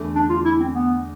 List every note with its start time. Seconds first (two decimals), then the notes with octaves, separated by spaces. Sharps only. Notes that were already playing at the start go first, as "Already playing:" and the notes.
Already playing: E2 D3 A3
0.16 D4
0.30 F4
0.45 E4
0.60 C4
0.74 B3